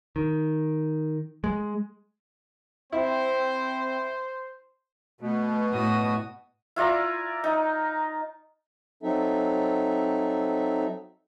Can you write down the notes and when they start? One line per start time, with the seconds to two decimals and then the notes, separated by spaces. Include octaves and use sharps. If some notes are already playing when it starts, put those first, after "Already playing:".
0.16 D#3
1.44 G#3
2.92 C4 E4 C5
5.21 B2 A3
5.72 A2 F#4 D#6
6.76 E4 F4 D5 A#5
7.44 D#4
9.03 F#3 C4 D#4 A4 E5